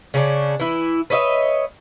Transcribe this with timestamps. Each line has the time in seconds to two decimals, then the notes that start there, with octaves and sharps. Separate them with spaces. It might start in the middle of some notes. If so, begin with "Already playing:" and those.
0.14 C#3 C#4 D4
0.60 E3 E4
1.10 B4 C#5 D#5 E5